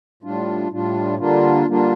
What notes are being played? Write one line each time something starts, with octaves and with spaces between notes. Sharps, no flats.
A2 G3 D4 F4
A2 G3 D4 F4
D3 G3 A#3 D4 F4
D3 G3 A#3 D4 F4